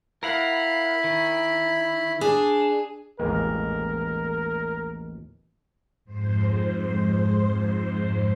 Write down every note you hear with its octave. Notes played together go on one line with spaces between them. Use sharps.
E4 A#4 F5 F#5 B5
D#3
D4 G#4
A1 D#2 G#3 A#4
F2 G#2 C5